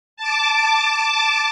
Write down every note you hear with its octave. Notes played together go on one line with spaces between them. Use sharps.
A5 D6